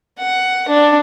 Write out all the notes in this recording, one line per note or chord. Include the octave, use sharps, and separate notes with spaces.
F#5
D4